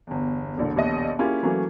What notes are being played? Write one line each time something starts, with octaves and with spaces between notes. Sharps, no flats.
G1 E2
E1 A#1 D3
D#1 A#1 B2 D#5
A#3 C#4 E4 F4 G4 G#4
E3 F#3 A3 A#3 C#4